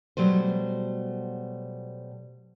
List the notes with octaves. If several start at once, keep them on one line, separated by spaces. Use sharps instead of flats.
B2 F#3 G3 A3 C5